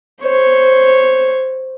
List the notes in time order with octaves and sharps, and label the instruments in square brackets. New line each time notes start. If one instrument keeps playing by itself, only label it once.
[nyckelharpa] C5 C#5